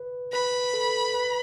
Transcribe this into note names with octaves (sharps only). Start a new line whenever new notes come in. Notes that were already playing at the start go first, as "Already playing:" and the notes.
Already playing: B4
B4 B5
A4
B4